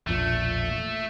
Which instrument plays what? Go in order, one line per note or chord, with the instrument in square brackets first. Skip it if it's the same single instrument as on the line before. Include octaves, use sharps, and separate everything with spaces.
[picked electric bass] E1 A#1 A#2 [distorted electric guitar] A3